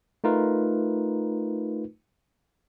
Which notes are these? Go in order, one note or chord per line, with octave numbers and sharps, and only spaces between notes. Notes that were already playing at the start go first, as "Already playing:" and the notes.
A3 D#4 F4 A#4 B4